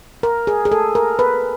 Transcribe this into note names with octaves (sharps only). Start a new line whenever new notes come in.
A#4
G#4
G#4
A4
A#4
B4